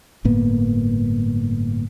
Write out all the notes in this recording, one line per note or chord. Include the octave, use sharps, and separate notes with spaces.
G1 A2 A#3 B3